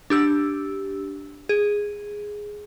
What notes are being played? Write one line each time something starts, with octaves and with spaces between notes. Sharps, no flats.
D4 G4 E6
G#4